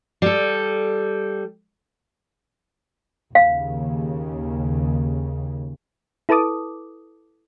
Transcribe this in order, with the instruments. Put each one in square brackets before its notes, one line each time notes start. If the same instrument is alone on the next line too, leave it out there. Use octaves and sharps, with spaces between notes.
[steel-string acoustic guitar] G3 A4
[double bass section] D#2 C#3 [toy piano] F5
[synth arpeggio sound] E4 A4 B4 A5 D6 D#6